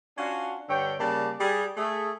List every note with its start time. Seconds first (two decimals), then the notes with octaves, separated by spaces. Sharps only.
0.17 C#4 D4 F4 F#4
0.69 G2 D3 C#5 G5
0.99 C#3 G3 A#3 D5 A5
1.39 G3 G#4
1.77 A3 G#4